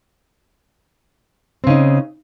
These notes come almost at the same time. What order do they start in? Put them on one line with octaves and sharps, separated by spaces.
C4 C#3 D#4